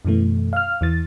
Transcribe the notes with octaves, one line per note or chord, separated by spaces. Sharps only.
F#2 B2 E3 A3
F5 F6
E2 E3 A6